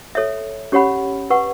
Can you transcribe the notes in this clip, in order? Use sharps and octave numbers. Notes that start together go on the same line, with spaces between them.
A4 C#5 E5
C#4 G4 C#5 F#5 B5
B4 F#5 C#6